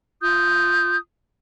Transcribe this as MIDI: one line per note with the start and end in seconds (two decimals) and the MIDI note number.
0.22 0.97 65
0.22 0.97 87
0.22 0.97 91